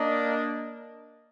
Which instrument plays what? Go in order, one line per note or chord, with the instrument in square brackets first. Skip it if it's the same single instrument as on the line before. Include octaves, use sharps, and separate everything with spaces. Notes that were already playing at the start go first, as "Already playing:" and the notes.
Already playing: [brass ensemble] A#3 D4 [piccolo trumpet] D#5